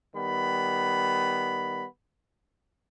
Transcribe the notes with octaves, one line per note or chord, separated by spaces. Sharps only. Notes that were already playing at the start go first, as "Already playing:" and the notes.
D#3 G3 B3 B5